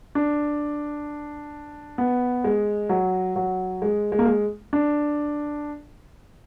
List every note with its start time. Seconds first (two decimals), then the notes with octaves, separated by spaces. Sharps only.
0.15 D4
1.98 B3
2.44 G#3
2.89 F#3
3.36 F#3
3.82 G#3
4.12 G#3
4.19 A#3
4.26 G#3
4.73 D4